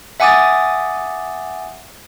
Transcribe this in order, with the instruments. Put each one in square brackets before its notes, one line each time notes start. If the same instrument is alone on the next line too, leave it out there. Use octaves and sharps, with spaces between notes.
[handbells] E5 F#5 G#5 D6 D#6 A6